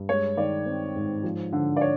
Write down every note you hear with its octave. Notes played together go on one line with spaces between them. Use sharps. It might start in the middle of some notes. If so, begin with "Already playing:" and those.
Already playing: G2
G#3 C#5
D#3 D5
C4
G#2
F3
D3
D5
C#5